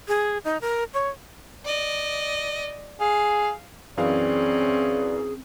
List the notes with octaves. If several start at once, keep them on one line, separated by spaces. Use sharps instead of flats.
G#4
D#4
A#4
C#5
D5 D#5
G#4 F5
F#2 E3 C4 C#4 G#4 D5 F5